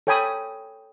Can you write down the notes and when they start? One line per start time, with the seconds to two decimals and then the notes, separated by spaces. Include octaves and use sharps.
0.07 A4 C#5 G5 G#5 B5 D#6